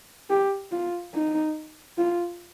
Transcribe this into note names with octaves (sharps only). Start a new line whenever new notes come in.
G4
F4
D#4
F4